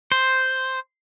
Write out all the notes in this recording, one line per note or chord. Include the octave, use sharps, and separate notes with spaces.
C5